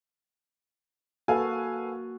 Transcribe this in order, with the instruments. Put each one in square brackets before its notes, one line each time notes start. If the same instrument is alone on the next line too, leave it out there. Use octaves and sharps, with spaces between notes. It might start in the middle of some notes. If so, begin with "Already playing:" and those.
[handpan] A#3 F#4 [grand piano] A4 [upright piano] B4 F5 G#5